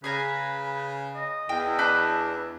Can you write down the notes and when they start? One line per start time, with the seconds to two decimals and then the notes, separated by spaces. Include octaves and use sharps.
0.04 C#3 G#4 B4 G#5 A#5
1.15 D#5
1.49 E2 G5
1.79 D4 B4 G6